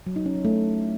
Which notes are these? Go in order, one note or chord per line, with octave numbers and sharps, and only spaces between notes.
F#3
D#4
C#4
F#3
A3